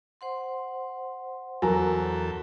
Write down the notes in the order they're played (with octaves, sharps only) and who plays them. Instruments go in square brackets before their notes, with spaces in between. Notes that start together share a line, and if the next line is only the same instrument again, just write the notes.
[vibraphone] C5 F#5 C6
[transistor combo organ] E2 A4 [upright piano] F#3 A#5 [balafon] A#4 G#5